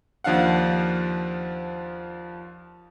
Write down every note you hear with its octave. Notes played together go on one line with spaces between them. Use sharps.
D#2 F3 D4 F5 F#5